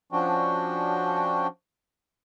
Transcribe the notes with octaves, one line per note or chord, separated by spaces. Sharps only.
F3 C#4 D4 F#4 G5